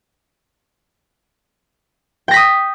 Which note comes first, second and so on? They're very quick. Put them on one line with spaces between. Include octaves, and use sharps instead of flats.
G5 A#6 B6 D#6